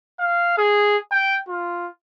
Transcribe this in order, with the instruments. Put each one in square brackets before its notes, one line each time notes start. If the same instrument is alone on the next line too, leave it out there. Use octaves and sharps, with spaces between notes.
[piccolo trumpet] F5
G#4
G5
F4